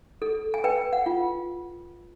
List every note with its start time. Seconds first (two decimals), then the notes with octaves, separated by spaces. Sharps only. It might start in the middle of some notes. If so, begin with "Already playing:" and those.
0.22 A4
0.54 G#5
0.64 B4 G5
0.93 F#5
1.06 F4